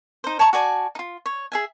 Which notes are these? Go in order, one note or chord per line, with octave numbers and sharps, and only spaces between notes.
D#4 C5
C#5 A5 A#5 C#6
F#4 D5 G#5 A5
D#4 F4
C#5
G#4 E5 G#5